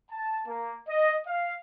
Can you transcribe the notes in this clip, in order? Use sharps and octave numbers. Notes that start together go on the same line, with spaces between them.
A5
A#3
D#5
F5